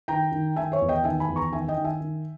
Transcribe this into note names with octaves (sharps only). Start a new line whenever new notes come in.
D#3 G5 A#5
D#3
D#3 E5 G#5
C#5 E5
E2
D#5 G5
D#3 E5 G#5
G#5 B5
E2
A#5 C#6
D#3 E5 G#5
D#5 G5
D#3
E5 G#5
D#3